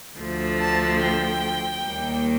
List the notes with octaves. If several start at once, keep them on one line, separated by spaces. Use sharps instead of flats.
D2 D3 F3
A5
G5
D#2 D#3 G3 A#3